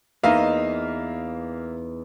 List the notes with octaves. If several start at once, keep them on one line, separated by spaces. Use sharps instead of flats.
E2 A#3 D#4 E5 F5